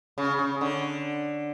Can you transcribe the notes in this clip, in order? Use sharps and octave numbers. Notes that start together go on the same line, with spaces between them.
C#3
C#3
D3